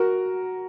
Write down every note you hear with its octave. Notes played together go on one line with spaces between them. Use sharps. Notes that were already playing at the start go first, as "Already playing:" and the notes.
Already playing: F#4 A#4